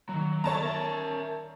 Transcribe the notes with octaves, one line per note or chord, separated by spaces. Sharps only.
D#3 F#3 A#3
B3 A4 C#5 D5 A5 A#5
A#4 E5